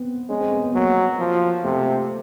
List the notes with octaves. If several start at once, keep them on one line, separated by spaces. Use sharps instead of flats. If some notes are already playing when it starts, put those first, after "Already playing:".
Already playing: B3 C4
G#3 C#4
C4
B3
B3
F#3 A#3
F3
C3 A3